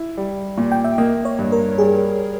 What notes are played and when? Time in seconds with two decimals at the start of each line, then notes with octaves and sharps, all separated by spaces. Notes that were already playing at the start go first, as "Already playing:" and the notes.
Already playing: E4
0.17 G3
0.58 A#2
0.72 G5
0.84 E5
0.98 A#3 D#5
1.25 C#5
1.39 G2
1.52 A#4
1.78 G3 G#4